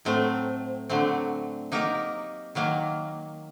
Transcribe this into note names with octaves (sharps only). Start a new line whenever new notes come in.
A2 F#3 A3 C4
D3 F#3 A3 C4
F#3 A#3 D#4 G4 A#4
D#3 F#3 A#3